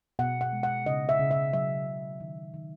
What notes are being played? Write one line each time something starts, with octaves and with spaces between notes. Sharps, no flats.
B2 F#5
F#5
G#3
F#5
C#3 D#5
E5
C#3
E5
F#3 E5
C#3
D#3
D#3